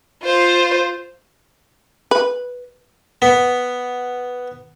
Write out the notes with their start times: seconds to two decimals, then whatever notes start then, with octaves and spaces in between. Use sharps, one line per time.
0.24 F4 C5
2.11 B4
3.22 B3